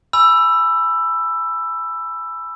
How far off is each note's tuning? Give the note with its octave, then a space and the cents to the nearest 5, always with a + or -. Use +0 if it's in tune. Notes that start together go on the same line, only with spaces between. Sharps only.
G#5 +0 B5 +0 E6 +15